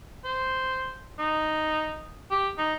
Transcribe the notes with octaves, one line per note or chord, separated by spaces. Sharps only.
C5
D#4
G4
D#4